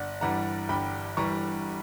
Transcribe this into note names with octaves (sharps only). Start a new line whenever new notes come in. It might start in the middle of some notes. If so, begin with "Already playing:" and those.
Already playing: G1 D5 F#5
G2 E3 G3 F#5 A#5
G1 G5 B5
E3 G3 A#5 C#6